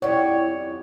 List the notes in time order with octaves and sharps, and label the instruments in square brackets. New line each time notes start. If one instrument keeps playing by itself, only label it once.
[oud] F2 G3 [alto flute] E4 [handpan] C#5 [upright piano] D5 F#5